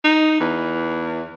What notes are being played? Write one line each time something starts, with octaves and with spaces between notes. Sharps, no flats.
D#4
E2